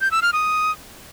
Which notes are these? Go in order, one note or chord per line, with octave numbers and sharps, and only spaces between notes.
G6
E6
F6
D#6